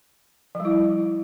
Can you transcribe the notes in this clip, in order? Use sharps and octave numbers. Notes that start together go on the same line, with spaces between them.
F3
G3
E4